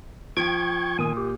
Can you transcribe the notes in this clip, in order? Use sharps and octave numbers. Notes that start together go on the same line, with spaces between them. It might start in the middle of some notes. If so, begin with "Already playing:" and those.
F3 G5 C#6 G#6
A#2 D#3 G#5 D#6
G4